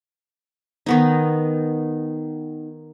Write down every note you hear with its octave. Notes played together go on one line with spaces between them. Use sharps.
D#3 B3 D#4